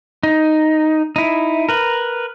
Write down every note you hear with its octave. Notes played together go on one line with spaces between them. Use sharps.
D#4
D#4 E4
A#4 B4